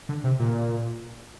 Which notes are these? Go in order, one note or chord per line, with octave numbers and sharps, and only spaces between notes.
D3
C3
A#2